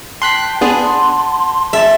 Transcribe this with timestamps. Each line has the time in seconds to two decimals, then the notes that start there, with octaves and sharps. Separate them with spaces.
0.22 G5 A5 C6 F#6 B6
0.61 B3 D4 G#4 F#5 A5 B5 C6
1.73 G#4 E5 A5 A6